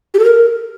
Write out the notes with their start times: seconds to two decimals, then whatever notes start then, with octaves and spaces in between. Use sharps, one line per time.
0.14 G4
0.19 A4
0.24 A#4